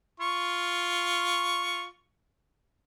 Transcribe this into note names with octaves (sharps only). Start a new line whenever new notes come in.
F4 C#6